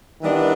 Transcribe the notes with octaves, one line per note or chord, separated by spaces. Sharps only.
D#3 E3 G3 B3 D4